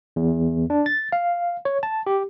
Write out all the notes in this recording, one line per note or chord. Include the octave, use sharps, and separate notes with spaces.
E2
D4
A6
F5
C#5
A5
G4